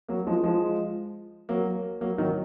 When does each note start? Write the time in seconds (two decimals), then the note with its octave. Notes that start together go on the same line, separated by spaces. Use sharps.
0.08 F#3 A#3
0.27 F3 G#3
0.44 F3 G#3
1.49 F#3 A#3
2.01 F#3 A#3
2.18 D#3 F#3